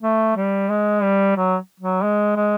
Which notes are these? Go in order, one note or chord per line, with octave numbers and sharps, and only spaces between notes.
A3
G3
G#3
G3
F#3
F#3
G#3
G#3